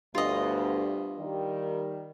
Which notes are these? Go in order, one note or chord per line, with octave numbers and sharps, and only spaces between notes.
D2 G2 B2 F4 D#5
D#3 G3